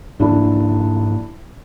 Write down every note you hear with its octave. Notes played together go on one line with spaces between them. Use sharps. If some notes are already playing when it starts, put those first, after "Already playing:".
G#2 F3 A#3 D4 E4